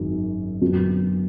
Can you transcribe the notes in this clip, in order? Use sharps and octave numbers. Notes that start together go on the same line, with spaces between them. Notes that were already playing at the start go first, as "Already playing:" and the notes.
Already playing: G#1 F#2 D#3 G#3
F#2 D3 F#3 B3